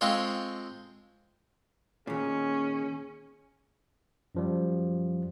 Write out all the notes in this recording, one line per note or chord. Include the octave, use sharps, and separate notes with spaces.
G#3 C4 F4 A4 C#5
D#2 A#2 C#4 G#4
F#2 F3 G3